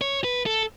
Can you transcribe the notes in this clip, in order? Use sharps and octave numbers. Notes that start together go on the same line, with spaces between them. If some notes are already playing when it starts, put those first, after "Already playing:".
C#5
B4
A4